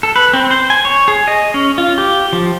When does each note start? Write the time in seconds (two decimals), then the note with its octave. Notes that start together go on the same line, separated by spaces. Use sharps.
0.03 A4
0.16 B4
0.33 C4
0.51 C5
0.70 G#5
0.85 C#5
1.08 G#4
1.28 D#5
1.54 C#4
1.78 F4
1.98 G4
2.33 F3